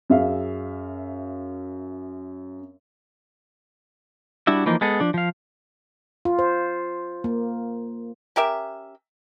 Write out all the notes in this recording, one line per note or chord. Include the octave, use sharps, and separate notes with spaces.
F#2 G#4 E5 F5
G3 D4 E4 F#4 E5
E3 F3 A#3 D#4
G#3 B3 G#4 A4
F3 D4
F3 F5
F4
C5
A#3
C#4 G4 A#4 E5